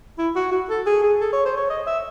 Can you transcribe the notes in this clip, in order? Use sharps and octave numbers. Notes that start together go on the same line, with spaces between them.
E4
F#4
F#4
A4
G#4
G#4
A4
C#5
C5
C#5
D#5
E5